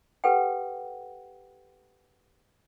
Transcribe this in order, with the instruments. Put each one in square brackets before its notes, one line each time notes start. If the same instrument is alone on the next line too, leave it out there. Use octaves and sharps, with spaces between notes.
[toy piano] G4 A4 B4 F#5 G5